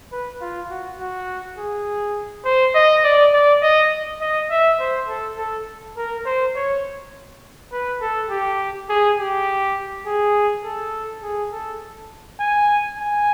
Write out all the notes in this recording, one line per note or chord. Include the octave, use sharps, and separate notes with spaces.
B4
F4
F#4
F#4
G#4
C5
D#5
D5
D5
D#5
D#5
E5
C5
A4
A4
A#4
C5
C#5
B4
A4
G4
G#4
G4
G#4
A4
G#4
A4
G#5
G#5